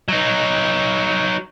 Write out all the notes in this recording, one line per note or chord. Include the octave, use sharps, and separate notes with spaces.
F#3 D#4